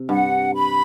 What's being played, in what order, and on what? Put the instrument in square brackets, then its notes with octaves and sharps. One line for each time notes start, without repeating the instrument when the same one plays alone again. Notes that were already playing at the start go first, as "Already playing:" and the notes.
Already playing: [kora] C3
[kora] G2 [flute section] F#5
[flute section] B5